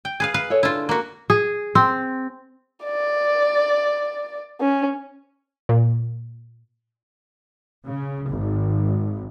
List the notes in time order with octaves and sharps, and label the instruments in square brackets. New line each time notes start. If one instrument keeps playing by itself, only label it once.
[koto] G5
G#4 B4 F5
B4 F5
[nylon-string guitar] A4 C#5 E5
[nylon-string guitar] D3 D4 [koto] E4 F4
[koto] A#3 F#4
[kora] G#4
C4
[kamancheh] D5
C#4
[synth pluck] A#2
[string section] C#3
G#1